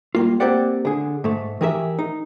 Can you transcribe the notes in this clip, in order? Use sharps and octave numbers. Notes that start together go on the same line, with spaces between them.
G3 A#3 F4
A#3 C4 G4 D5 F#5
D3 G#4
G#2 A3
E3 G4 G#4 A#4 D5 E5
D#4